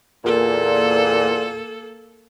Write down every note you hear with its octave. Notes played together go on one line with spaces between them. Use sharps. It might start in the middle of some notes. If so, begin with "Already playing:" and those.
E2 A#2 A#3 A4